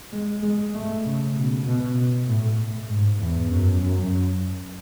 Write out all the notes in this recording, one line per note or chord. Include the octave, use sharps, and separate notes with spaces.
G#3
G#3
A3
C#3
B2
B2
A2
G#2
E2
F#2
F#2